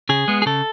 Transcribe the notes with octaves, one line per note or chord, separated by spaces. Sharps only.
C#3 G#4
G#3 B3
G#4
C#3 A4